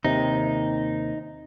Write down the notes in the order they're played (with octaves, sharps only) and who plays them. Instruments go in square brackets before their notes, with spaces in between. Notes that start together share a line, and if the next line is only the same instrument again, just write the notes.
[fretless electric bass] D#2 C3 [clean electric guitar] D#4